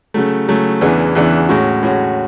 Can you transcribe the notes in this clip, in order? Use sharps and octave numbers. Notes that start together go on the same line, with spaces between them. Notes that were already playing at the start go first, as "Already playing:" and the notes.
C#3 F#3 A3
C#3 F#3 A3
E2 C#3 E3 B3 D4
E2 C#3 E3 B3 D4
A2 G#3 C#4 F#4
A2 G#3 C#4 F#4